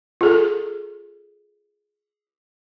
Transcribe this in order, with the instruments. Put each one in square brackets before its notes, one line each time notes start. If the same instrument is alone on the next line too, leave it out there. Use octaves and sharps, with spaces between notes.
[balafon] F4 G#4 A4